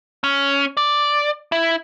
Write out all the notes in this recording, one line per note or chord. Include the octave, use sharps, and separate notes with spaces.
C#4
D5
E4